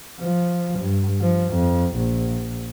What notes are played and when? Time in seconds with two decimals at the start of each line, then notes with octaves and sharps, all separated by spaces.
0.20 F3
0.80 G2
1.21 F3
1.54 F2
1.96 A#1